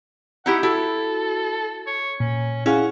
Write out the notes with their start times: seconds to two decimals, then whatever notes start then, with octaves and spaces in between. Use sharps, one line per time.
0.46 D#4 E4 G4 F#5
0.63 E4 F#4 A4
1.87 C#5
2.20 A#2 C#4
2.66 C#4 E4 G#4 F5 F#5